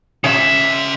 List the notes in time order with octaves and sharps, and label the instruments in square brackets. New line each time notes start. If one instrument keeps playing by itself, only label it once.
[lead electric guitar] C#3 E5